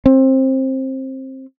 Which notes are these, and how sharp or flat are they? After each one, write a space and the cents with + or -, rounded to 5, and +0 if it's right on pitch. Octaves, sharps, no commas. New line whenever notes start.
C4 +20